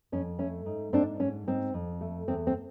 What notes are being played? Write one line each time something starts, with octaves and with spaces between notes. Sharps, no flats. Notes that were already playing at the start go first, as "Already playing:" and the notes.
F2 C#4
A3 C#4
G#2
G#2 C4 D4
G#2 C#4
G#2 C4
F2
A3
E2 C4
C4